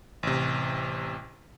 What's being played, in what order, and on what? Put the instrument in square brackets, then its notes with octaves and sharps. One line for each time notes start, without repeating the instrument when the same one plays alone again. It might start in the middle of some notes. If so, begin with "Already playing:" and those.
[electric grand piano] A1 C3